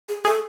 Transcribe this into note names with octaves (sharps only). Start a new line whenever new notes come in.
G#4
G#4 A4